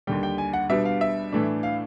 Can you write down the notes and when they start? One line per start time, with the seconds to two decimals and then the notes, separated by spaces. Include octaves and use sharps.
0.07 D#2 D3 G3 G5
0.23 G5
0.38 G#5
0.53 F#5
0.69 B2 G3 B3 D4 E5
0.85 F5
1.01 E5
1.32 A2 E3 A3 D4
1.63 F5